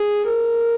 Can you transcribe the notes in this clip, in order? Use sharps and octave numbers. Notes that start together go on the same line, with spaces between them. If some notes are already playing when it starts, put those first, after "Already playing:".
Already playing: G#4
A#4